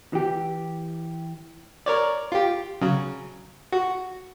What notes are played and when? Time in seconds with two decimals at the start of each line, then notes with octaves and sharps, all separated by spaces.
0.13 E3 G4
1.86 A#4 C#5 D5
2.32 F4 G4
2.81 C#3 F#3
3.72 F#4